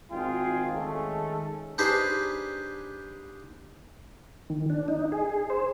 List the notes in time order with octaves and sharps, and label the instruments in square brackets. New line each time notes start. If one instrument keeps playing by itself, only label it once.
[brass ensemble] G#1 G#2 F4 G#4 G5
D#3 G#3 A3 C#4
[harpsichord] D4 D#4 G4 G#4 B4 C5
[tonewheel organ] D#3
D4
D#4
G#4
C5